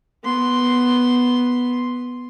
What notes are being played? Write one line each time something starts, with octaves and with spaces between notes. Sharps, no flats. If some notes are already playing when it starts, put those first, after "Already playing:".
B3 C6